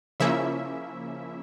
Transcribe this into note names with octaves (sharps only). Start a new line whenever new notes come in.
C#3 F3 A#3 C#4 E4 E5